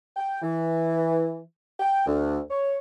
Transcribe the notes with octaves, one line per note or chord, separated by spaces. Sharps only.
G5
E3
G5
D2
C#5